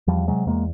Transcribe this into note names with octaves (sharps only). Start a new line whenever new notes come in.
E2 F3 G3
C3 F#3 G#3
E2 G#3 A#3